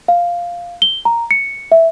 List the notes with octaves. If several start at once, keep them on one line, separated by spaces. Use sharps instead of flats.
F5
G7
A#5
C#7
E5